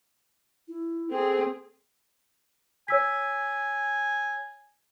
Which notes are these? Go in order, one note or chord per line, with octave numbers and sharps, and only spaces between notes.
E4
C4 G#4 A4
C#5 G#5 E6 B6